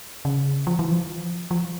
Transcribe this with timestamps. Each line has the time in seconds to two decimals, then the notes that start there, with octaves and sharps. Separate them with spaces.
0.25 C#3
0.67 F3
0.79 E3
0.91 F3
1.51 F3